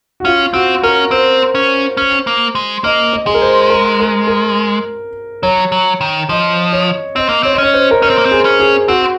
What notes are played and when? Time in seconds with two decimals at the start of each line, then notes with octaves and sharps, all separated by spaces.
0.20 F#4
0.25 C#4 F4
0.54 C4 F#4
0.83 C#4 A#4
1.11 C4 C5
1.55 C#4
1.97 C#4
2.27 A#3
2.55 G#3
2.84 A#3 D#5
3.13 D#5
3.27 G#3 G#4
3.34 A#4
3.42 C5
3.70 A#4
4.00 A#4
4.27 A#4
5.43 F#3 C#5
5.72 F#3
6.01 D#3
6.29 F3 D#5
6.73 C#5
7.15 C4 D#5
7.29 A#3
7.43 C4 C#5
7.53 D#5
7.58 C#4 C#5
7.74 C5
7.91 A#4
8.02 C#4 C5
8.10 C4
8.18 A#3
8.25 C4
8.31 G#4
8.45 C#4
8.60 G#4
8.88 C4 F#4